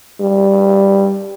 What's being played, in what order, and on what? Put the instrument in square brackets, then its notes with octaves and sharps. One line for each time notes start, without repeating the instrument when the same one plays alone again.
[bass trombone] G3